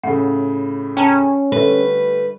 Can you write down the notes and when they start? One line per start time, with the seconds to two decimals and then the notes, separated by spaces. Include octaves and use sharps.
0.04 A2 C#3 F#5
0.97 C#4 G5 A5 A#5
1.52 D3 G3 A3 B4